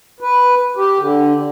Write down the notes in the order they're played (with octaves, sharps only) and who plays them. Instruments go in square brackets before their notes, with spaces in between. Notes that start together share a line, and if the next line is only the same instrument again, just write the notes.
[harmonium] B4
G4
D3